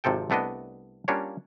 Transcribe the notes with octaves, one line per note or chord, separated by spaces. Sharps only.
G#1 C3 F3 A4 G5
C2 A3 B3 D4 D#5
G3 A#3 C#4 D4 F4 C#5